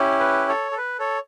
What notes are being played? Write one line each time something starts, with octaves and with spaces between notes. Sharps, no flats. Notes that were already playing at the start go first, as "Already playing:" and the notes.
Already playing: C#4 E4 G4
B4
A4 C#5
A4
B4
A4 C#5